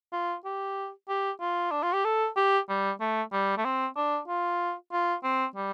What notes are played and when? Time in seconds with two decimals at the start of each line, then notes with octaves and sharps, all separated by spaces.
0.13 F4
0.45 G4
1.09 G4
1.41 F4
1.71 D4
1.83 F4
1.93 G4
2.05 A4
2.36 G4
2.69 G3
3.00 A3
3.33 G3
3.58 A3
3.65 C4
3.96 D4
4.28 F4
4.92 F4
5.23 C4
5.56 G3